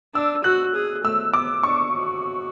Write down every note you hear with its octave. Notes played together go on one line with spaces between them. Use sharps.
D4 E6
F#4 F#6
G#4
A3 E6
B3 D6
D4 C#6
F#4